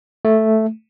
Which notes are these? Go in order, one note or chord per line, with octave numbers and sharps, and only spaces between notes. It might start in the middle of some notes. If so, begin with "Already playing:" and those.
A3